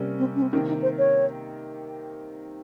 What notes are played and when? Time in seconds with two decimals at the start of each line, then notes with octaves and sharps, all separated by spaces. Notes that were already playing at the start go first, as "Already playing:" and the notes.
Already playing: C3 G3 A#3 C#4
0.19 C4
0.36 C#4
0.42 C4
0.53 C3 D#3 A#3 C#4
0.68 D#4
0.82 C5
0.99 C#5